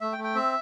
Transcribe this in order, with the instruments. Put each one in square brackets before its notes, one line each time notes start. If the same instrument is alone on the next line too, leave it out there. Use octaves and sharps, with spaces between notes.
[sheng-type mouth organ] A3 E5
G5
A3
G5
C4 E5